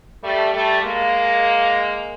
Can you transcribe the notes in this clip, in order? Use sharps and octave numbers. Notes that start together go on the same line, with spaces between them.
G3 A3
G3 A3
G#3 A#3